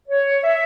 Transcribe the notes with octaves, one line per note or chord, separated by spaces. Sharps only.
C#5
E5